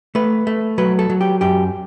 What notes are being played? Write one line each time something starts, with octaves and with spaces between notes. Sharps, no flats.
A3 B4
A3
F#3 B4
A4
F#3
G4
F#2 G4